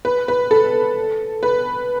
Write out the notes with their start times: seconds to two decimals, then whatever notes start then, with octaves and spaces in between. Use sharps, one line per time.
0.05 B4
0.28 B4
0.51 A4
1.43 B4